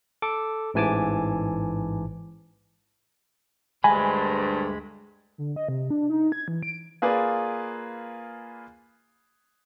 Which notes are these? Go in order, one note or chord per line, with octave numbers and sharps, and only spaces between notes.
A4 D6
A1 G#2 E3 G#5 A5 D6
D2 G2 G#3 G#5 B5
D3
D#5
C3
D4
D#4
G#6
E3
D7
A#3 F4 G#4 B4 D5